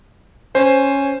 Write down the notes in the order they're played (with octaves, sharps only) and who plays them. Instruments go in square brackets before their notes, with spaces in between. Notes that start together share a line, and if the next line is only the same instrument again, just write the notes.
[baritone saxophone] C#4 [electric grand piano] C5